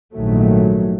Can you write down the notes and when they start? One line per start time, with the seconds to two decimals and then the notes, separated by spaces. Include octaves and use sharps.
0.14 A#1 G#2 D#3 F#3 A3